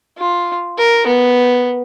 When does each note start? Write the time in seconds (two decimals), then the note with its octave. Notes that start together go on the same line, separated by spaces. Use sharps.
0.18 F4
0.78 A#4
1.07 B3